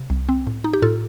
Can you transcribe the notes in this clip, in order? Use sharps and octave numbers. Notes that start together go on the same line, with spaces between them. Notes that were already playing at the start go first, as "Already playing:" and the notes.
Already playing: C3
C2
C4
A2
D#4
G4
A2 F4 A4